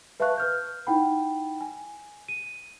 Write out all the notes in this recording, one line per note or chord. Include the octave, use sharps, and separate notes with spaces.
B4 E5 F5 A5 C#6 F#6
B4 F6 G6
D#4 E4 F#5 G5 B5
G#5
D#7